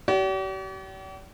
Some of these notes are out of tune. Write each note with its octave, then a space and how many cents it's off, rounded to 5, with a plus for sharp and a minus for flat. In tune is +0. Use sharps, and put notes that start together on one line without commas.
G4 -45 D5 -40